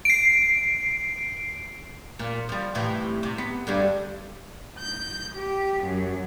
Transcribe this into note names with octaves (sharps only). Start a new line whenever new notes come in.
C7 D7
A#2
F3 G3
A2 C3 E3
C3
B3
G2 D3 G3
G6
G4
F#2